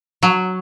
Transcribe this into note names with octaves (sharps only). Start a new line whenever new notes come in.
F#3